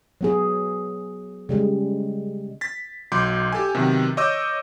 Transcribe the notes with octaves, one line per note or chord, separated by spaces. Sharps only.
F#3 B3 G#4
C#3 G3 G#3
A6 B6
B1 F#3 C6 D6 G6
G4 A4 G#5
C3 D#3 F#3 B3
C#5 D#5 C#6 D6 E6 G6